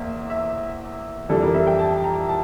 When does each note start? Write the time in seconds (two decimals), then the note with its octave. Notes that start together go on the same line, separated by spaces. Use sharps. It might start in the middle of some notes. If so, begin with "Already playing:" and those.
Already playing: E2 A#3 C5 E5
0.30 E5
1.29 F2 E3 G3 D4 A4
1.41 A#4
1.54 E5
1.67 G5
1.79 A5
2.04 A#5
2.29 A5